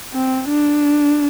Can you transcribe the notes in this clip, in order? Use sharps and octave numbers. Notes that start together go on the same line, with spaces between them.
C4
D4